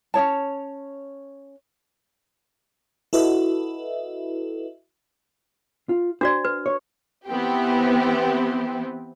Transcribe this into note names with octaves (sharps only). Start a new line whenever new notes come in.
C#4 D#4 C#5 A5
E4 F#4 A4 B4 D#5 E5
F4
D4 F#4 C5 D5
B4
C#5
E3 B3 C4 G4